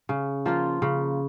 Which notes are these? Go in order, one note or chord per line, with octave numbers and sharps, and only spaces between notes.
C#3
F3 A#3 F4
C#3